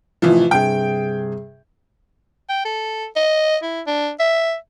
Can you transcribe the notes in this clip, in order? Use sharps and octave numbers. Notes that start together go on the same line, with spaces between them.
A1 C3 E3 F3
G2 C3 G#4 G5
G5
A4
D#5
E4
D4
E5